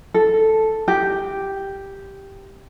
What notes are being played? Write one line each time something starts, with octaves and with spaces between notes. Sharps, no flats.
A4
G4